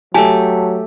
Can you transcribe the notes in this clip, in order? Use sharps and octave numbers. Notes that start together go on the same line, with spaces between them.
F#3 A3 G4 G#5 A5